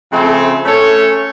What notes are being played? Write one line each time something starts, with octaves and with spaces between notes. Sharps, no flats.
C#3 F3 A3 C4
A3 C#4 A4 C#5